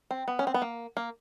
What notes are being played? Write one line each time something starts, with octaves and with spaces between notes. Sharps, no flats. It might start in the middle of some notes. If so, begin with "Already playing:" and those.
C4
B3
C#4
C4
B3
A#3
A#3